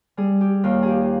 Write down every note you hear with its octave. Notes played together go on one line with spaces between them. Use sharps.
G3 G#4
G4
D#2 F4
G4 G#4